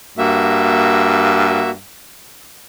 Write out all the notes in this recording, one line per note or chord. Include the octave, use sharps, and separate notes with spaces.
G2 A#3 F#4 E5